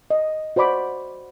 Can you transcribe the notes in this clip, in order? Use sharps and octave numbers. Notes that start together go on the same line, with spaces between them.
D#5
F#4 C5 D5 B5 D6